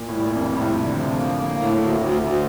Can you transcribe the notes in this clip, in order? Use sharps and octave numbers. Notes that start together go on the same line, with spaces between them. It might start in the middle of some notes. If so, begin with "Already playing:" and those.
Already playing: A#2
A2
G3
A#2
F2 G3
G2
A2 C3
F2
C3
D3
D3 F3
A#3
A#3
A2
D2
D2
D2